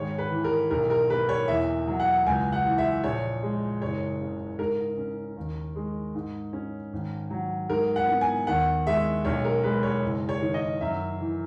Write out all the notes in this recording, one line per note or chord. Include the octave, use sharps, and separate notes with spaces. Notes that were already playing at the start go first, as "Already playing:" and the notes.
Already playing: G#1 G#3 C#5
B4
E3
A#4
B1 A#4
A#4
A#3 B4
C#5
E2 E5
F#3
F#5
C#2 G#5
F#5
E3
E5
A#1 C#5
G#3
F#1 C#5
C#3
G#2 A#4
C#4
D#2
G#3
G#2
C#4
G#1
F#3
G#2 A#4
F#5
B3
G#5
D#2 F#5
G#3 E5
B1 C#5
A#4
G#3 B4
C#5
F#1
C#5
D#3
D#5
F#2 E5
E3